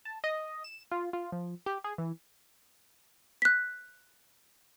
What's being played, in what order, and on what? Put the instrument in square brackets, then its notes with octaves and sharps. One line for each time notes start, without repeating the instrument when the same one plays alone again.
[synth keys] A5
D#5
E7
F4
F4
F3
G4
G#4
E3
[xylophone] F#6 B6